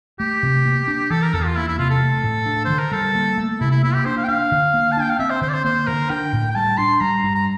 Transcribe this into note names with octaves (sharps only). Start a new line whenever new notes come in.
A3 G4
C3
A#3
D4
E3 A4
A#4
E2 A4
F4
A#3 E4
E4
C3 F4
A4
A3
A2
D4
C5
D3
A#4
G3 A4
A#3
A3
C3 E4
E4
A#3 E4
G4
D4 C5
F5
G5
D4 F5
D3
A#3
A5
D4 G5
F5
C4 E5
C5
D3 C5
D5
C5
A#3 C5
D3 A#4
D4 G5
A2
G5
G3 A5
D4 C6
G3 A#5
G2
A#5